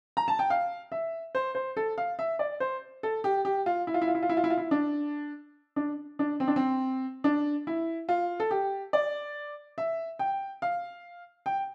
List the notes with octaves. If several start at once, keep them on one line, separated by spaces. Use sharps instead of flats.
A#5
A5
G5
F5
E5
C5
C5
A4
F5
E5
D5
C5
A4
G4
G4
F4
E4
F4
E4
F4
E4
F4
E4
F4
E4
F4
E4
D4
D4
D4
C4
D4
C4
D4
E4
F4
A4
G4
D5
E5
G5
F5
G5